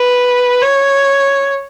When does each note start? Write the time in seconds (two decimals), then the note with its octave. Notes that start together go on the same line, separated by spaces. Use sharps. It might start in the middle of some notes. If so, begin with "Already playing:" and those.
Already playing: B4
0.62 C#5